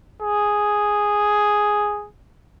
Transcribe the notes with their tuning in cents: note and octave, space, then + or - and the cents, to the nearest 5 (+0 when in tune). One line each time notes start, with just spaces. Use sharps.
G#4 +0